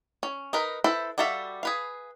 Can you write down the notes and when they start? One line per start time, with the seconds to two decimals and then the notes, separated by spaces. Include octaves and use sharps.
0.23 C#4
0.53 D#4 A#4 B4
0.84 E4 A4 B4 C5
1.18 G3 F#4 A4 E5 F5
1.63 G#4 B4 F5